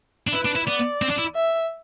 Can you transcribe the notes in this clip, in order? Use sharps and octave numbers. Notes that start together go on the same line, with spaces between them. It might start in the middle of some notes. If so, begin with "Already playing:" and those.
D4
E4 B4
D4
E4
B3 D5
C4
D4
E4
E5